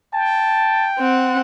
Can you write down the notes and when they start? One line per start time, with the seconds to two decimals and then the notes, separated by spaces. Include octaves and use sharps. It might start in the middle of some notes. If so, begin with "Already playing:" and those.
0.13 G5 A5
0.99 C4 F#5